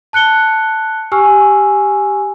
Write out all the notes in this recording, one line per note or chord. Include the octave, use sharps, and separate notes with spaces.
A5 F#6 C#7 G7
G4 G#5 C#6 E6 F6